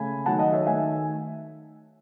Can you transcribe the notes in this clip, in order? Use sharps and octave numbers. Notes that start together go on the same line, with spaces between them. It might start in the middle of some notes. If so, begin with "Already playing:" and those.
Already playing: C#3 A3 G#5 B5
D#3 F#3 A3 F#5 A5
D#5 F#5
C#5 E5
D#3 A3 E5 G#5